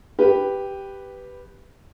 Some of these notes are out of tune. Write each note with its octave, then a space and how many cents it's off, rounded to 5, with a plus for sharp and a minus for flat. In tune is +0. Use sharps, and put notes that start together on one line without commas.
G4 +0 B4 +0 G5 +5